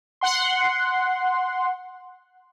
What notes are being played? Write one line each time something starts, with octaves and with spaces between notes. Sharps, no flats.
F#5 C6